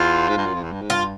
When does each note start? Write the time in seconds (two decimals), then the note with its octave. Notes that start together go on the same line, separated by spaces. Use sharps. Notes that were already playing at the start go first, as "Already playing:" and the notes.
Already playing: E2 F4
0.29 G#2
0.37 G2
0.46 F#2
0.54 F2
0.64 E2
0.72 G2
0.82 G#2
0.90 G2 F4